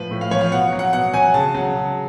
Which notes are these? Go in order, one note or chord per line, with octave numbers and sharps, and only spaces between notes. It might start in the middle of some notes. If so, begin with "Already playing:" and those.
Already playing: A2 F3 B4
A2
F5
F3 C#5
F5
B2 F#5
F#3
F#5
B2 F#5
F#3 G#5
C#3 A5
F#3
C#3